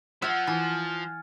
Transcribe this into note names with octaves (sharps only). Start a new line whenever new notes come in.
F3 E5 F#5 F6 G#6 A6
E3 G#5 F6 A6